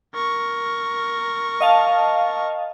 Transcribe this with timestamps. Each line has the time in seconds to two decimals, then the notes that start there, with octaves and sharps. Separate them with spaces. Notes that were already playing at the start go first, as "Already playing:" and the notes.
0.14 A#4 C#6
1.60 D#5 F5 A5